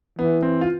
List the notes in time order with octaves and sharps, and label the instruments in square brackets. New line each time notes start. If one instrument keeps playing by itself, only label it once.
[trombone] E3 [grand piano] B3
[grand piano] C4
F4